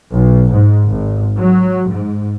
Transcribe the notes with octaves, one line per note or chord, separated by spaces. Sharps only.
B1
G#2
G#1
F#3
G#2